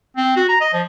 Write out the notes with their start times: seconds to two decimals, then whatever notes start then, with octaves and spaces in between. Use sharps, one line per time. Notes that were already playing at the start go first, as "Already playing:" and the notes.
0.17 C4
0.37 F#4
0.49 A#5
0.61 D#5
0.73 F3